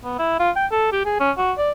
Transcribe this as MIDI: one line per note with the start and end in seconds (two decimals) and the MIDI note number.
0.04 0.15 59
0.19 0.36 64
0.40 0.50 65
0.56 0.66 79
0.71 0.89 69
0.92 1.05 67
1.05 1.17 68
1.20 1.31 61
1.38 1.52 66
1.58 1.71 74